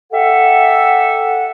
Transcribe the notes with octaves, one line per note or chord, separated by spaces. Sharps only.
G4 A4 E5 F#5